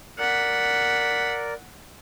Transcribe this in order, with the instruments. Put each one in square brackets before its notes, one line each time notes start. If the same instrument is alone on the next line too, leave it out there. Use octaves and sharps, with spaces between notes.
[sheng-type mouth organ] A#4 D5 [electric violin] F#5 B6